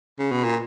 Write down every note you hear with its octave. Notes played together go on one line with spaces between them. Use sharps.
C#3
B2
A#2